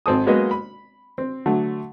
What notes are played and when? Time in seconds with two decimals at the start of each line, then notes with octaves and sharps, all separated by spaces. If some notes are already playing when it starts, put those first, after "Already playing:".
0.06 G#1 C4 A4 D#6
0.26 F#3 G#3 A#3 B3 F#4 D#5
0.51 B5
1.18 C4
1.46 D3 F#3 A3